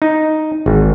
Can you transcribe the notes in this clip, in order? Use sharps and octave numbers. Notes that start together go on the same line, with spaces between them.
D#4
G#1